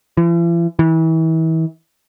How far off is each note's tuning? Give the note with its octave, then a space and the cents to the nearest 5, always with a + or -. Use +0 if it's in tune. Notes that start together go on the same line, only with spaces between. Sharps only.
E3 +45
E3 -35